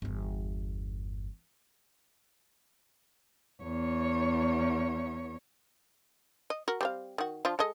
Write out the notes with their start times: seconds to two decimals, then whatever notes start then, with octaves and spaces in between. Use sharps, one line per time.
0.02 G1 E2
3.62 E2 C#5
6.50 D#5
6.68 F#4 A#4
6.81 G3 C4 F5
7.18 D#3 F#4
7.45 F3 D4 F4
7.59 G#3 A4 D#5